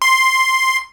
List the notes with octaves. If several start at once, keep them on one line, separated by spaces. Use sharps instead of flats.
C6